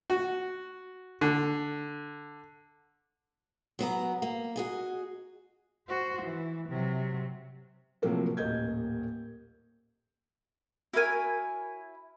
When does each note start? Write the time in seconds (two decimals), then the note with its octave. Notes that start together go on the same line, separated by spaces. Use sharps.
0.10 F#4
1.21 D3
3.79 F#3 B3 A#4
4.22 A#3
4.56 F#4 G#4 D#5
5.88 F#4 C5
6.23 E3
6.69 C3 F#3
8.02 A2 C3 F3 F#3 A#3 A4
8.37 D#1 A1 A#3 D#5 G6 G#6
10.93 E4 F#4 A#4 C#5 G#5